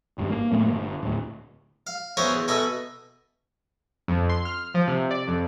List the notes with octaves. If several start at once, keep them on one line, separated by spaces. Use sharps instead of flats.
G#1 G2
A#3
A2 A3 A#3
G1
D1 D2
F5
B3 C#4 A#4 C5 C#5 E5
E2
B2 A4 E5 G#5 A#5 B5
F2
C6
F6
F3
C3
D5
F2